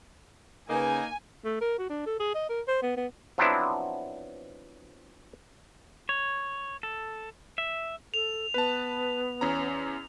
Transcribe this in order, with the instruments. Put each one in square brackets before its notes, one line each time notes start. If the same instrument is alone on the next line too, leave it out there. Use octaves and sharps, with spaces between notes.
[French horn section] C#3 B4 [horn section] A#3 D#4 [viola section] G#5
[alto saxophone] A3
A#4
F#4
D4
A4
G#4
D#5
A#4
C5
B3
B3
[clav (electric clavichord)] F3 F#3 B3 C4 D4 E4
[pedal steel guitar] C#5
A4
E5
[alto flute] A4 [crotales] F7
[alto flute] B3 [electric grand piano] B4 A5
[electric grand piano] E2 C#4 A#5